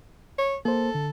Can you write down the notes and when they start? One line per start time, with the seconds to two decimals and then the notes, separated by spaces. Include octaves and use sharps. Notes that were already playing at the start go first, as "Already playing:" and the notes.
0.38 C#5
0.65 A#3 A4 C5
0.95 D3